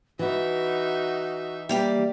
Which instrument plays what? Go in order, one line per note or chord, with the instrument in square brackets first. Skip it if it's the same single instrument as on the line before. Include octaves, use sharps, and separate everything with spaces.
[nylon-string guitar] E3 E4 [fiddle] D#4 E5 [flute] F#4
[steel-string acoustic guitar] G3 A#3 G4 [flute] E5